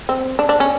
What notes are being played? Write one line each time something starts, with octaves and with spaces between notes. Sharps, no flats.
C4
D4
D4
C#4